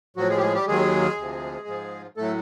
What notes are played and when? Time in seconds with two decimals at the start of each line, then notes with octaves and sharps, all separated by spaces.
0.16 A2 F3 F#3 F#4
0.30 G#3 G#4
0.37 G4
0.41 G#3 G#4
0.54 G3 G4
0.67 D#2 D#3 F#3 G#3 G#4
1.17 D2 C3 F3
1.68 G#2 F3
2.17 A2 F#3 A3 A4